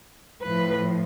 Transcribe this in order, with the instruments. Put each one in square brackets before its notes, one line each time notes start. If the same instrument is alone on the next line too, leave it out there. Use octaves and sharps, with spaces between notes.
[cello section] A2 F3 B4